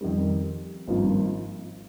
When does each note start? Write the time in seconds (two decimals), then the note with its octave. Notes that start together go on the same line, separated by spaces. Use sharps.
0.01 F2 D#3 G3
0.87 G#1 G2 F3 A#3 F4